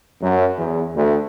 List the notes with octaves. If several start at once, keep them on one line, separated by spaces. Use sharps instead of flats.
F#2
E2
D2